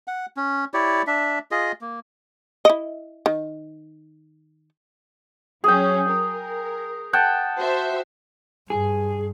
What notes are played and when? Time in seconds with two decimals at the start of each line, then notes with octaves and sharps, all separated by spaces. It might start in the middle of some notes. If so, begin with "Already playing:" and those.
0.08 F#5
0.37 C#4
0.74 E4 G4 C#5 D5
1.07 D4 E5
1.51 F4 G#4 D#5
1.81 A#3
2.65 E4 D#5
3.26 D#3
5.64 F#3 C#4 G#4 G5
6.10 A#4
7.13 F#5 G5 A5
7.58 F#4 C5 E5
8.70 G2 G#4